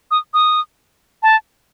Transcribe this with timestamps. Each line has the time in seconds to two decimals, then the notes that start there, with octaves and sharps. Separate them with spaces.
0.11 D#6
0.34 D#6
1.23 A5